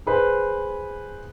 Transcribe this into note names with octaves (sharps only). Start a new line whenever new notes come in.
G#4 B4 C5